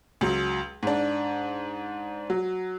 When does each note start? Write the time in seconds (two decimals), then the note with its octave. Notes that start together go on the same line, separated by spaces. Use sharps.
0.21 C#2 F#3
0.83 G#2 D4
2.30 F#3